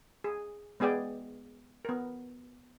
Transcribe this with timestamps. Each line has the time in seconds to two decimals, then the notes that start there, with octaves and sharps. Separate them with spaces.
0.24 G#4
0.80 G#3 B3 G#4 D5 G5
1.85 B3 A#4